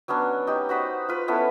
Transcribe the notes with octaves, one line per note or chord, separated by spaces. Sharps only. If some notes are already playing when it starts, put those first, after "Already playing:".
F#3 B3 C#4 D4
D#4 G4
F#4 C5 B5 D#6
F4 B4
B3 C#4 E4 A4